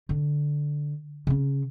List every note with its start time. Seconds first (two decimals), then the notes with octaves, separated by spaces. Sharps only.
0.09 D3
1.27 C#3 C#4